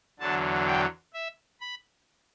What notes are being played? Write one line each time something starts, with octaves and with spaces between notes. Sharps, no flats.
E2 D3 F#3 A5
G5
E5
B5